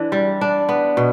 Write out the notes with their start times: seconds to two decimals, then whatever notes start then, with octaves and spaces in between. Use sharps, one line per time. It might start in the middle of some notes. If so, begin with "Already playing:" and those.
Already playing: E3 D4
0.12 G3
0.41 D4
0.69 B3
0.97 B2